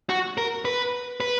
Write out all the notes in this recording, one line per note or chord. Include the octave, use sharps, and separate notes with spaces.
F#4
A#4
B4
B4